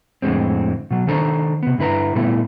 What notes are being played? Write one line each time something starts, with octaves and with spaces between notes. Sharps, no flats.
F2 A2 D3 G#3 C4
B2 F#3
D#3 D4 A4 C5 A#5
C3 B3
G2 D3 E4 B4 A#5
A#2 G3 A3 B3 E4